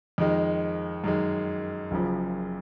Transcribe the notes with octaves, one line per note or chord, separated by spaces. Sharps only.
F2 D#3 G#3
F#2 D#3 G#3
F#1 F#2 C#3 F3